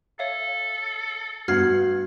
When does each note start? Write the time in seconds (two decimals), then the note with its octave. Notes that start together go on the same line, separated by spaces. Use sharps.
0.19 A4 C#5 E5 F5
1.48 G2 B3 F#4 F6 G#6 C7